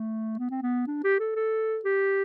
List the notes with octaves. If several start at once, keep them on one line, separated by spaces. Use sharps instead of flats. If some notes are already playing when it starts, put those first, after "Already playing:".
Already playing: A3
B3
C4
B3
D4
G4
A4
A4
G4